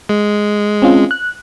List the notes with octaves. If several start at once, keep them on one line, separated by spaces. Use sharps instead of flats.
G#3
C4 C#4 F4
F#6